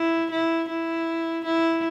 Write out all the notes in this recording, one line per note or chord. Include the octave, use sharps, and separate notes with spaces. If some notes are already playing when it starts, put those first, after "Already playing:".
Already playing: E4
E4
E4
E4